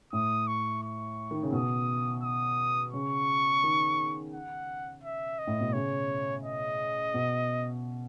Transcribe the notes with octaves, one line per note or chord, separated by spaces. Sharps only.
A2 D#6
C#6
C#6
D#3
C#3
B2 D#6
D#6
C#3 C#6
D#3
F#5
E5
D#5
A2
B2
C#3 C#5
D#5
B2